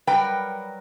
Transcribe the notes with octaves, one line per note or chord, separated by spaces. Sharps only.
F#3 G3 A#4 B4 G5